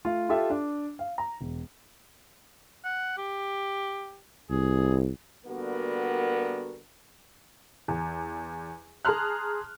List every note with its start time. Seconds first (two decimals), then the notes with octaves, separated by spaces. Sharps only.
0.05 A3 F4
0.29 F4 G4 A4 E5
0.50 D4
0.99 F5
1.18 A#5
1.41 E1
2.84 F#5
3.18 G4
4.50 C2 G#4
5.46 D3 G3 A#3 B3 F#4 A#4
7.88 E2
9.05 G#4 A5 A#5 C6 F6 F#6